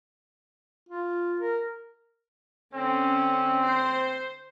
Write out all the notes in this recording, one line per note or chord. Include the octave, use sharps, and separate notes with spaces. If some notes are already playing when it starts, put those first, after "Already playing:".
F4
A#4
D3 C4 C#4
C5